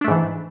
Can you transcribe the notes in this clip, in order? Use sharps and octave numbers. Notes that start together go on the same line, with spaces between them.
G#2 E3 A3 D4